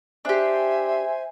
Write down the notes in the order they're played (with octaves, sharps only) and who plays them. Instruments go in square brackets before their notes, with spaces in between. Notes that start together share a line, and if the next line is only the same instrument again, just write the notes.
[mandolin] D4 G4 [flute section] C5 E5 G#5